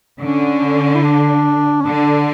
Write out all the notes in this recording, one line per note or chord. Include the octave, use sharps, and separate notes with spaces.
D3 C#4
E4
D4
C#4
D3 D4